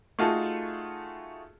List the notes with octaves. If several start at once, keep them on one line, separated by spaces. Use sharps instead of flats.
A3 D#4 F4 F#4 G#4 A4